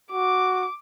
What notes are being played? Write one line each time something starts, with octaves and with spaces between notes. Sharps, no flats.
F#4 D6